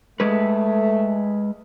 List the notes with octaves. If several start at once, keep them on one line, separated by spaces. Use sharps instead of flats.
G#3 A3 B4